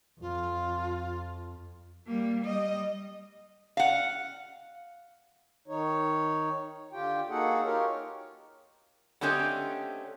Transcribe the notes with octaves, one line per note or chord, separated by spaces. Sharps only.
F2 F4
G3 A#3
G3 D#5
F5 F#5
D#3 D#4 C#5
D3 F4 G4 G5
A#3 D#4 F#4 G#4 A4 F#5
D#4 F4 G4 A#4 C#5
D3 A3 C4 C#4 G4 D#5